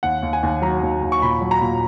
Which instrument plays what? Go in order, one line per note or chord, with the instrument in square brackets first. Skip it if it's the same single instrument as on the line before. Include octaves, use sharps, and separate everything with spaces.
[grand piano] D#2 F#5
D#2
G#5
D#2
F#3 A#5
D#2
D#2
C#6
A#2 B5
F#3
A#5
A#2